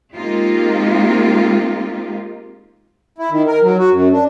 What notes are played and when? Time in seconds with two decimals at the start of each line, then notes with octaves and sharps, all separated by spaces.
0.14 G#3 A#3 C4 D#4 F4 G4
3.18 E4
3.31 D#3
3.48 A#4
3.62 F#3
3.78 F#4
3.91 F#2
4.12 D4